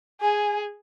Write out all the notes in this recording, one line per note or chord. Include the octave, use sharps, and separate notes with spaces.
G#4 G#5